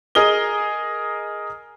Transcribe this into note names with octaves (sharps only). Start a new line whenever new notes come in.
G#4 A#4 D#5 G7